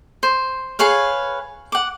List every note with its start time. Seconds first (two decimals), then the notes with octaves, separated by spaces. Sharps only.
0.23 C5
0.79 G#4 B4 C#5 F5
1.72 F#5 D6